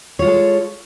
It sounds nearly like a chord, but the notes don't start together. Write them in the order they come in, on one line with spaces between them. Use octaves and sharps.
C#5 F4 G#3 A4